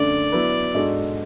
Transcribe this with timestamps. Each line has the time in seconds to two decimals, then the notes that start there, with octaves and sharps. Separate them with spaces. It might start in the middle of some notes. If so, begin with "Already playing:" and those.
Already playing: F#2 D3 A3 D4 D5
0.32 F#3 B3 E4 B4
0.74 G#2 G#3 D4 F#4 A4